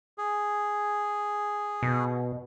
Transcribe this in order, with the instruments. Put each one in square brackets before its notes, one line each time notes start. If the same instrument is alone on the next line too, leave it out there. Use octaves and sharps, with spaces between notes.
[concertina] G#4
[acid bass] B2